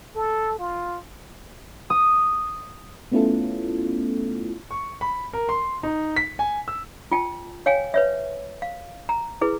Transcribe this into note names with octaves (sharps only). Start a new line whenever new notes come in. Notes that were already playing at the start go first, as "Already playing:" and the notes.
A4
F4
D#6
A3 B3 C#4 E4 F4 A4
C#6
B5
A#4
C6
D#4
B6
G#5
E6
F4 G5 A5
C#5 F5 G5 G#5
B4 C#5 E5
F5
A#5
E4 G#4 B4